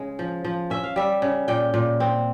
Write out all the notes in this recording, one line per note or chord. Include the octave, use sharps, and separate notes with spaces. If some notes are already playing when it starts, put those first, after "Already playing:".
Already playing: C#3 G#3
F3
F3
C#4 E5
F5
G3 E5
C#3
A#2 G5
A#2
C4